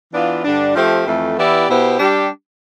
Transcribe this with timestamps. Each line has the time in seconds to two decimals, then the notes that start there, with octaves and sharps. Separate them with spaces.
0.12 E3 B3 D4 F4
0.43 G2 D3 G3 D4
0.74 F3 A3 C4 G4 C5
1.06 F2 E3 A3
1.36 E3 B3 E4 G4 D5
1.68 B2 B3 E4 G4 C5
1.98 G3 D4 G4